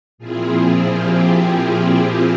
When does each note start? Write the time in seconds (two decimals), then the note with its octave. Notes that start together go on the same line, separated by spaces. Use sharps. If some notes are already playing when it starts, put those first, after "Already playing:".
0.18 A#2 F3 C4 E4 F4 G#4
0.84 E4 G4